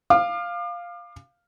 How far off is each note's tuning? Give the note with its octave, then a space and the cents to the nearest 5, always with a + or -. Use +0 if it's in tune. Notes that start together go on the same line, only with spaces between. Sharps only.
F5 +0 D6 +35